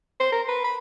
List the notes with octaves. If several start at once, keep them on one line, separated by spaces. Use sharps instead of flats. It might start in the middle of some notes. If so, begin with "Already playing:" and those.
C5
A#4
B4
B5